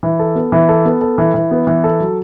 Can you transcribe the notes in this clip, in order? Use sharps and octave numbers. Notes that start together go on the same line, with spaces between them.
E3
A4
B3
E3
A4
B3
A4
E3
E3
B3
E3
A4
F#3